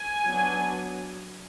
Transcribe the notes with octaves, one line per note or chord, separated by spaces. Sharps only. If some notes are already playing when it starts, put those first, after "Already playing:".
Already playing: G#5
F#3 B3 D4